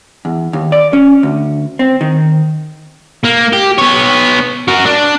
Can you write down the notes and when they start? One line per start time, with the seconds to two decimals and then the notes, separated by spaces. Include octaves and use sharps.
0.25 E2
0.53 D#2
0.72 D5
0.93 C#4
1.23 D2
1.79 C4
2.01 D#3
3.24 A#3
3.53 G4
3.79 B3 C#5
4.68 F#4 A#4
4.86 D4